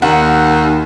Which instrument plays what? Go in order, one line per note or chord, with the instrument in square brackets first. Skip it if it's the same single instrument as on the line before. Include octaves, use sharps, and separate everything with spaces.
[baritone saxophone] D#2 [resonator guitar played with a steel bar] F#5